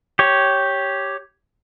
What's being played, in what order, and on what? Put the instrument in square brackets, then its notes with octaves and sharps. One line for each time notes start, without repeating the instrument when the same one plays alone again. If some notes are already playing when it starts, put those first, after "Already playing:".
[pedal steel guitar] G4 C#5